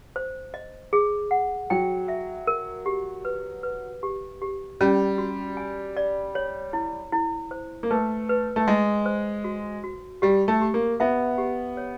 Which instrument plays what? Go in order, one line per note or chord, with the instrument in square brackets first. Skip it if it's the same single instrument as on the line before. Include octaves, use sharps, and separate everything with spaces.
[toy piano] C5
D#5
G#4
F#5
[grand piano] F#3 [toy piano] G5
[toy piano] E5
A#4
G4
B4
B4
G4
G4
[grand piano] G3 [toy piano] C#4
[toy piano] F#4
G#5
D5
C#5
E4
E4
C5
[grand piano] A#3
[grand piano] A3 [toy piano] B4
[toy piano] B4
[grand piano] A3
[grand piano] G#3 [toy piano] D#5
[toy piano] C5
F#4
F#4
[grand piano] G3 [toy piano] G4
[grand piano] A3
[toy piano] G4
[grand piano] A#3
[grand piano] B3 [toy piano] E5
[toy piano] G4
C#5